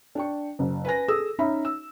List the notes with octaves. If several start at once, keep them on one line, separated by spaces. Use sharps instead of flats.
D4 G5 C#6
F#1
B4 G#5 A#6
G#4 A4 D#6 E6
C#4 D#4 E5 B5
E6